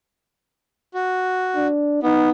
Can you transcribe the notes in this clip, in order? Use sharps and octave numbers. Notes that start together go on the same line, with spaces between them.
F#4
D4
B3 D#4